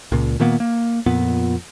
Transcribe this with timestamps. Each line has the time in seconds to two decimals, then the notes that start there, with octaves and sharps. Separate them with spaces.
0.12 C#2 A#2
0.40 A#2 D#3 A#3 B3
0.60 A#3
1.06 F2 A#2 B3